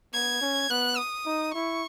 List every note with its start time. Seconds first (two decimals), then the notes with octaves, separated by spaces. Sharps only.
0.13 B3 G#6
0.41 C#4
0.70 B3 F#6
0.98 D#6
1.26 D#4
1.54 E4 C#6